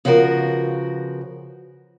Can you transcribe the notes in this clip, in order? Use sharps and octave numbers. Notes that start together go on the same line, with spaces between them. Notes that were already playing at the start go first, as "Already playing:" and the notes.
C#3 F3 B3 F#4 A#4